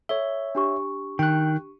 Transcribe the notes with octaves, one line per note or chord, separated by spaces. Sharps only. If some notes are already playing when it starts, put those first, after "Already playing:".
A4 C#5 E5 G7
D4 G4 C#6
D#3 G5 F#6